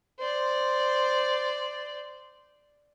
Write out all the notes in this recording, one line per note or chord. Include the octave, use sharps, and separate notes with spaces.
C5 D5